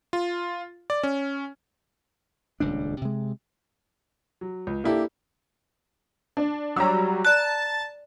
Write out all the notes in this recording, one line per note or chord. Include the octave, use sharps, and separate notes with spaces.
F4
D5
C#4
D#1 C#2 G3 D4
C3 G#3
F#3
C#2
A#3 D4 E4 G4 A4
D4
F#3 G3 A#5 E6
D5 A5 F#6